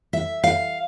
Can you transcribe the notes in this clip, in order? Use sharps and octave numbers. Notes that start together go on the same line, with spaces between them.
E5
F5